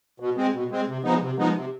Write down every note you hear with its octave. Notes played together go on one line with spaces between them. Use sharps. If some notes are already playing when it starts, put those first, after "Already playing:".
B2
G#3 C4
B2
G#3 C4
C3
F3 G#3 B3 D#4
C3
F3 G#3 B3 D#4
C3